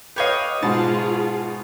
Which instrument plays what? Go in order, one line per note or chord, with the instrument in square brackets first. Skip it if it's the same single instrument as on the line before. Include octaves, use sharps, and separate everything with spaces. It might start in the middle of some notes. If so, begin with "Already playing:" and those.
[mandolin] G4 C#5 D#5 [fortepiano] B4 F5
[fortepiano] G#2 B2 [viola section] F4 G#4 [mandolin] A5